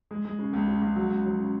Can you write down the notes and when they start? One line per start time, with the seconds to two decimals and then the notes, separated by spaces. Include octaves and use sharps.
0.11 G#3
0.25 G#3
0.39 C#3
0.53 C#2
0.68 C#3
0.82 C#2
0.96 F#3
1.10 C#2
1.25 F#3
1.40 C#3